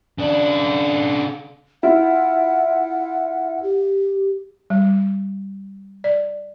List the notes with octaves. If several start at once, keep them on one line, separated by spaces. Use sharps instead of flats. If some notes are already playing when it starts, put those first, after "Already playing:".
C#3 D4
E4 F4 F#5
G4
G3
D5